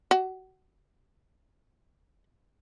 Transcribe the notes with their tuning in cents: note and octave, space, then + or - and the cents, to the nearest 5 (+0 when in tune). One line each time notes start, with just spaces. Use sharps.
F#4 +25